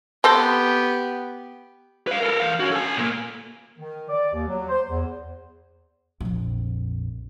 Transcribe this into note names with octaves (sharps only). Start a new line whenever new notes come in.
B3 C4 G4 A4 C5
B4 F5
A4 A#4
E3 F5
C#4 F#4
A4 G#5
A#2 A#3
D#3
D5
D#2
F#3
C5
E2
A#1 F2